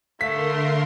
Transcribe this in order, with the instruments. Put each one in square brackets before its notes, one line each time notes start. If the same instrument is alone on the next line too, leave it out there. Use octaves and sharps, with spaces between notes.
[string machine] D3 A#4 C6 [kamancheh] A3 [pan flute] F5 [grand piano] B6